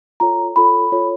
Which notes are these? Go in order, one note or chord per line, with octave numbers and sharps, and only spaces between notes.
F4 A4 C#5 A#5
F4 A4 C#5 B5
F4 A4 C#5